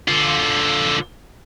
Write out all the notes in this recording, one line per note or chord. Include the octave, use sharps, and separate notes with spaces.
D3 F4